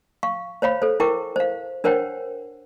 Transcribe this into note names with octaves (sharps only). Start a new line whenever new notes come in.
F5 C#6
C5 C#5 F5 B5
A4 C5
E4 A#4 G5 C#6 D6
C5 F5
D4 A#4 C5 C#5 F#5 G5